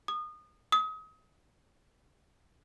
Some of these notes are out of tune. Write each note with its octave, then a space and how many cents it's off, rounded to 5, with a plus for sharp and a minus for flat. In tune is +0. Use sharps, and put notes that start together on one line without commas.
D#6 -25
D#6 +35